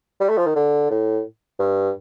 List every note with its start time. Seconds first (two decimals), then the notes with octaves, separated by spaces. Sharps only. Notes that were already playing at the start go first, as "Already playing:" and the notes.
0.20 G3
0.29 A3
0.38 F3
0.46 D#3
0.56 D3
0.90 A2
1.59 G2